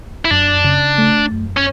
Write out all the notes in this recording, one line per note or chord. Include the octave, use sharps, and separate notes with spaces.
E4
F#2 D4
C#3
A3
F#2
C#4